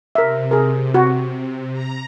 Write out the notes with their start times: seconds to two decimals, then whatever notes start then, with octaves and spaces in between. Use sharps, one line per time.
0.15 C3 A#4 E5
0.51 G#4 A#4
0.94 F#4
1.73 A#5